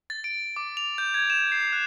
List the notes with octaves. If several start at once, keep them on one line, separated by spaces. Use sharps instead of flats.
A6
D7
D6
F7
G6
G#6
E7
C7
F#6